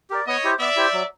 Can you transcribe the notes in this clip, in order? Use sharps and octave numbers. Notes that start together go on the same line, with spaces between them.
G4 A#4 D5
B3 C#5 D#5
E4 G4 C5
B3 D5 E5
E4 G4 C5
F#3